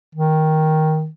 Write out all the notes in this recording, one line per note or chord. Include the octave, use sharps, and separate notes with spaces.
D#3